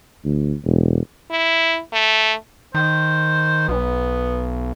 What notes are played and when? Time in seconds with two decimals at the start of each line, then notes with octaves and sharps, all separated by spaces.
0.24 D2
0.65 E1
1.31 E4
1.93 A3
2.75 D#3 C5
3.68 B1 B3